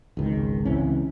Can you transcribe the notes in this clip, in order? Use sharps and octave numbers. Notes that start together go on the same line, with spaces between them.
G#1 C#2 D#3
C#2 C3 E3 C#4